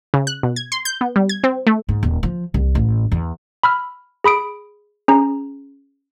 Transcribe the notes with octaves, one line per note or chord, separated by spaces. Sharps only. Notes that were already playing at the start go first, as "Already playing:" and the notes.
C#3
F#6
B2
G#6
C6
G6
B3
G3
G#6
C4
A3
G#2
D#1
F3
C2
A1
E2
B5 E6 F6
G#4 B5 D#6 D7
C#4 G#4 A#5